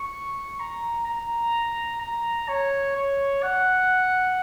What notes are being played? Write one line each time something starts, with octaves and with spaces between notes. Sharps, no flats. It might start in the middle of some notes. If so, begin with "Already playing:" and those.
Already playing: C#6
A#5
A#5
A#5
C#5
C#5
F#5